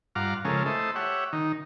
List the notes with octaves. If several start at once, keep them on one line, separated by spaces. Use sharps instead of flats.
G2 F4 F5 F#5 A#5 D6
C#3 F3 G#3 C#4 A4 A#4
A3 E4 A4 C5 D#5
G4 C#5 E5 F#5
D#3 D#4